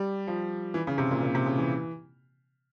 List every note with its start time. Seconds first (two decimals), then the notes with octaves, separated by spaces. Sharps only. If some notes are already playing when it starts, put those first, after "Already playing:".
Already playing: G3
0.28 F3
0.74 E3
0.87 C#3
0.98 C3
1.11 A#2
1.23 A#2
1.35 C3
1.46 C#3
1.58 E3